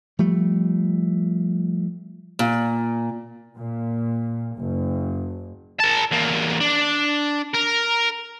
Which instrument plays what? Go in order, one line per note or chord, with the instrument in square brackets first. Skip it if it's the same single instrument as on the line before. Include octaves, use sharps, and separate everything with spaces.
[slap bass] F3 G3 A3
[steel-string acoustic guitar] A#2
[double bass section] A#2
F#1
[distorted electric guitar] A#4 A5
E2 A#3
D4
A#4